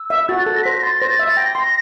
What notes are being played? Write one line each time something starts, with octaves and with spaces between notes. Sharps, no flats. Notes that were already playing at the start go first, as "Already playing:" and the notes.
Already playing: E6
E5
F#4 A6
A4
A#6
C5 B6
A#6
C6 A6
C5 A#6
A6
E5
A6
G5 A#6
C6